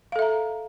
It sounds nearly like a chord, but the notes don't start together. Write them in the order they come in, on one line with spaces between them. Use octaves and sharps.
F5 A4 E5 A#5